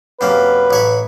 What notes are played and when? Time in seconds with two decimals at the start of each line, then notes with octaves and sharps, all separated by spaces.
0.21 F#2 C3 A#3 B4
0.71 A1 C#5 B5